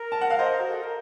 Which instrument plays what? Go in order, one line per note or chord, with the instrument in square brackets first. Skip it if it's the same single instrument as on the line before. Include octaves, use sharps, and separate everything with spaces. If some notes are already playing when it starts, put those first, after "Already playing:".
Already playing: [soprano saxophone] A#4
[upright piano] A5
F#5
F5
C5 D#5
[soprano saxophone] F#4
A4
A#4